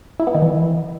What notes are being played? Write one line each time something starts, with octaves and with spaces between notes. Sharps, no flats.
E4
B3
D#3
E3